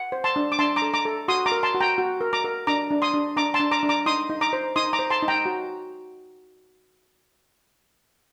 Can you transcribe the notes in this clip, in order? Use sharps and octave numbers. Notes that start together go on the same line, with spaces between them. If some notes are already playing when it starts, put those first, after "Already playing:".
Already playing: F#5
C5
A5 C6
D4
D6
D4 A5 C6
A#5 D6
A4
A#5 D6
A4
F#4 C6 D#6
A#5 D6
A#4
A5 C6
F#4
G5 A#5
F#4
A#4
A#5 D6
A#4
D4 A#5 D6
D4
C6 D#6
D4
D4 A#5 D6
A5 C6
D4
A#5 D6
D4
A#5 D6
D#4 C6 D#6
D#4
A#5 D6
C5
D#4 C6 D#6
A#5 D6
C5
A5 C6
D#4
G5 A#5
F#4